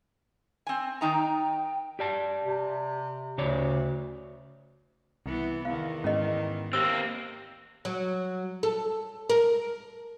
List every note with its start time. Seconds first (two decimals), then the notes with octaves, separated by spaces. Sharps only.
0.67 C4 G#5
1.01 D#3 D#4 G5 A#5
1.99 G4 D5 A5
2.45 C3
3.38 D2 C#3 C#5 D5
5.26 C2 E3 B3
5.65 E2 D#3 F5
6.04 G#2 C#4 D#5
6.73 A#3 C4 G4 C5 E6
7.85 F#3
8.63 A4
9.30 A#4